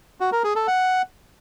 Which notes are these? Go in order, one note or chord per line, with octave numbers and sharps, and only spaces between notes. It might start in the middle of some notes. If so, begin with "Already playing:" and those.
F#4
A#4
G#4
A4
F#5